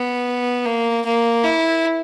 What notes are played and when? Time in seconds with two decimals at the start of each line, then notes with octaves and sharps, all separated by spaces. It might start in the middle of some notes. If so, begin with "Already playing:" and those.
Already playing: B3
0.65 A#3
1.05 A#3
1.44 E4